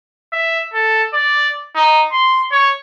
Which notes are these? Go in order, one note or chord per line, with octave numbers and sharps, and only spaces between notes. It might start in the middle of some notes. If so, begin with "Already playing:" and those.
E5
A4
D5
D#4
C6
C#5